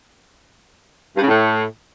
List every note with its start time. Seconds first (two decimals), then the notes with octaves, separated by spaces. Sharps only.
1.16 G2
1.22 C#3
1.28 A2